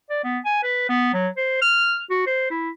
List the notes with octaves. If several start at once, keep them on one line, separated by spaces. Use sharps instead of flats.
D5
B3
G#5
B4
B3
F#3
C5
F6
F#4
C5
E4